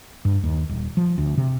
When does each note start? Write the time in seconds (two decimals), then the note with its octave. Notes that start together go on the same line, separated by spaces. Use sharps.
0.25 G2
0.43 D#2
0.69 D#1
0.97 F3
1.18 D2
1.37 C3